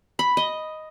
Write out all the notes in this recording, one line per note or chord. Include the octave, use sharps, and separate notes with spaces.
B5
D#5